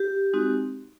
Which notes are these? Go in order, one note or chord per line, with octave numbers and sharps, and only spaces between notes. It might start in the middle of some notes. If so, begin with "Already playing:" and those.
Already playing: G4
G#3 C4 D#4 F#4